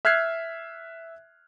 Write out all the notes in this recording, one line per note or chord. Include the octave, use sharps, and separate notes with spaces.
E5 F6 F#6 G#6 C7